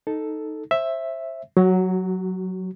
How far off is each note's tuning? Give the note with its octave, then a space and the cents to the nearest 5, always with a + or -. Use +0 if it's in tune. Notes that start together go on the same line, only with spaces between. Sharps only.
D#4 +0 A4 +0
C5 +30 E5 +0
F#3 +0 F#4 +30